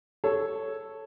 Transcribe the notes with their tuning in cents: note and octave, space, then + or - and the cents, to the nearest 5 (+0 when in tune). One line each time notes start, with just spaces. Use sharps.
A4 +0 C#5 +0